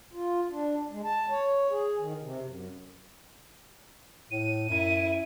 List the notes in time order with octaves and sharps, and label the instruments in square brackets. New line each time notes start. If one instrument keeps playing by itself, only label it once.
[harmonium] F4
D4
G#3
A5
C#5
G#4
D#3
C3
F#2
[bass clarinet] A2 [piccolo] D#7
[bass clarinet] F#2 [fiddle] E4